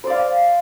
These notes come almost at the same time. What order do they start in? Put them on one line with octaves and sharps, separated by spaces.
C5 D5 F5